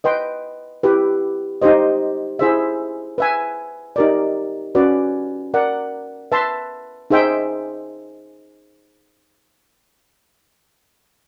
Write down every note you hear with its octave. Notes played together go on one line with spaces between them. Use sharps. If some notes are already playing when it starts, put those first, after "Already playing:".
B4 D#5 G5 C6
E4 G4 B4
D#4 G4 C5 D#5
E4 G#4 C5 E5
B4 E5 G#5
D#4 G4 A#4 D5
C#4 F#4 B4 D5
A#4 D5 F#5
B4 E5 A5 C6
D#4 G#4 C5 E5 G5